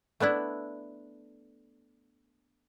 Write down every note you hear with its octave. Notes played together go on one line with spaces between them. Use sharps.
A3 B3 D4 E4